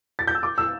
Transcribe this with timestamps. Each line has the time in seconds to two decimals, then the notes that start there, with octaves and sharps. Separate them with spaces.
0.19 A6
0.27 G6
0.35 E6
0.43 D6
0.58 E6